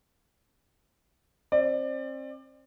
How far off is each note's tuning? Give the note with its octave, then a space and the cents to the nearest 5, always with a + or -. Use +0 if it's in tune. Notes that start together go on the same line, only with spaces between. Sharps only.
C4 +35 D5 +25